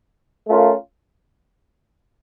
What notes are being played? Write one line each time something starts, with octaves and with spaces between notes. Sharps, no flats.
A3 C#4 F4 A#4